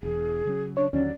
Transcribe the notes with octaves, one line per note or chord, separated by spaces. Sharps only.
E1 E2 G#4
C#3 F#3 C#4
D4 C#5
D#2 D3 F#3 C#4 D5